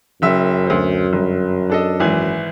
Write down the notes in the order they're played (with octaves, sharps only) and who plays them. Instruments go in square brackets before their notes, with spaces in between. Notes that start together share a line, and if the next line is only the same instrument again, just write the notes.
[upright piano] F#1 E5 [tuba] F#2
[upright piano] D2 C5
G1
D4 A4 D#5
G#1 E3 G#5